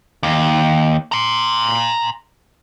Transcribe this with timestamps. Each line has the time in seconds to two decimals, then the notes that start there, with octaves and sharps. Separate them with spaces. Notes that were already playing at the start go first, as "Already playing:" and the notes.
0.23 D#2
1.12 A#5 C6